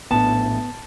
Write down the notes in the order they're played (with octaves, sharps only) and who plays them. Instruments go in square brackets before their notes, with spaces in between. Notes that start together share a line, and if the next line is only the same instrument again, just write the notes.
[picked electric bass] A#1 A2 D4 [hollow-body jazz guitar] B3 [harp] A5